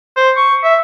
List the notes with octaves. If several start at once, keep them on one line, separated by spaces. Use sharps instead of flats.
C5
C#6
E5